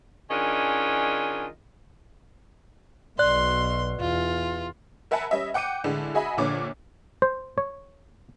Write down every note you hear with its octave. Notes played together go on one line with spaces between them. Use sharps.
D#3 C#4 D4 F4 G#4 D#5
B1 B2 D5 C6 F#6
E2 F4
A#4 E5 F#5 G#5 A5 B5
G3 C#4 D#5 E5
F#5 G5 D6 C#7 D#7
A2 D3 G#3 D4
F#4 G#4 D#5 E5 G#5 B5
A#1 A#2 D3 D4 C#5 D6
C5
C#5